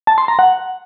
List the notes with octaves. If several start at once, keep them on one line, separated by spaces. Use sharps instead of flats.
A5
C6
A#5
F#5